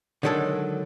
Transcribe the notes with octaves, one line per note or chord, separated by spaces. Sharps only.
D3 D#3 F#3 G#3 A4